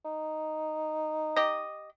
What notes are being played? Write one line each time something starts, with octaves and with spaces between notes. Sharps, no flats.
D#4
G4 D#5